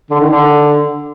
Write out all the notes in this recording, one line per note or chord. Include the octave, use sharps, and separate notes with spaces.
D3
D#3
D3